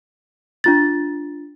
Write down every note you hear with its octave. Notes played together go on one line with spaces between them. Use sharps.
D4 F4 A6